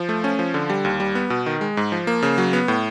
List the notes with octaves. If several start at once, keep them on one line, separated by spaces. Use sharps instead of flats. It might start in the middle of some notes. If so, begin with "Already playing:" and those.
Already playing: F3
A3
C#4
F3
D3
G3
D#2
G3
B3
B2
D#3
G#3
G#2
F3
A#3
C#3
F#3
B3
A2